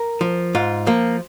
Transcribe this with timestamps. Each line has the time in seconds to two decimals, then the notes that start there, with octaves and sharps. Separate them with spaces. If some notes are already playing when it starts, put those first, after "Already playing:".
Already playing: A#4
0.21 F3
0.55 G#2 F4
0.87 F3 A#3